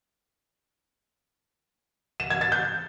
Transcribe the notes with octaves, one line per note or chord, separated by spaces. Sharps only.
E7
G#6
A6
G6